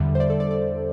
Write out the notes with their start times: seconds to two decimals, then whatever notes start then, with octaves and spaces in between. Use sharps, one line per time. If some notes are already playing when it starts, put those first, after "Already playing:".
Already playing: E2 D3 G3 E5
0.15 C5
0.20 D5
0.30 A4
0.40 D5
0.51 D5